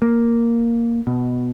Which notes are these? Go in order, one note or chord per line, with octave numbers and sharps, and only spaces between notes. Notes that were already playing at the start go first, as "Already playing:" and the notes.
A#3
B2